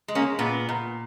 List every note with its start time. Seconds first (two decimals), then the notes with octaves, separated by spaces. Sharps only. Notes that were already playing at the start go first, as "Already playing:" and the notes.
0.08 G#3
0.15 A#3 C#4
0.39 A#2 B3
0.69 A#2